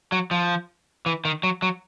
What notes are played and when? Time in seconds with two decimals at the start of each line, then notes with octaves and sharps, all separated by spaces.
0.12 F#3
0.31 F3
1.06 E3
1.25 D#3
1.43 F#3
1.62 F#3